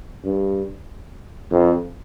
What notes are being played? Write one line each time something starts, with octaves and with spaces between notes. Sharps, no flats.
G2
F2